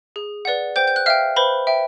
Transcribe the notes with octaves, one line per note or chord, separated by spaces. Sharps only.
G#4
B4 D5 F#5
C5 G5 G6
G6
F#6
E5 F5 G5 F6
B4 C5 B5
E5 G5